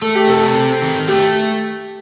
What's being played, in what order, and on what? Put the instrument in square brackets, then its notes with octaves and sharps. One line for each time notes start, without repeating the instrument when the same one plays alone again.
[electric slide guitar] A3 [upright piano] A4
[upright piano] G4
[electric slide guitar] C3 [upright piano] A4
[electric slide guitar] C4
D#3
[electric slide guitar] A3 [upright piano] G4